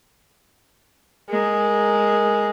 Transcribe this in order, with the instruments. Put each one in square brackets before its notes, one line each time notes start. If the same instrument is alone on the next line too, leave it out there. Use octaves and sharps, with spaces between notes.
[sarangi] G#3 [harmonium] A#4